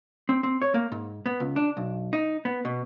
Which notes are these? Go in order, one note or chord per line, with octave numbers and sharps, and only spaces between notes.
C4
C4
C#5
A#3
G#2
B3
C#2
D4
B1
D#4
B3
B2